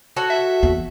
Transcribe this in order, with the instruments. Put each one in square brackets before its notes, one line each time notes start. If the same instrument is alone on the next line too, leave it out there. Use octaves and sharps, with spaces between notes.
[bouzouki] F#4 A4 C#5
[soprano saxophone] E5
[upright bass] E2